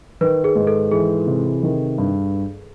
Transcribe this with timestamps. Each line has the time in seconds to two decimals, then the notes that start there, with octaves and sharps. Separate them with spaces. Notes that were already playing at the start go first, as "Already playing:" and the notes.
0.21 D#3 B4
0.44 G#4
0.55 G#2
0.67 A4
0.91 E3 G#4
1.27 C3
1.63 D#3
1.98 G2